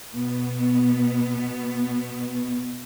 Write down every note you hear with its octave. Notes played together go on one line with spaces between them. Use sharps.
B2 B3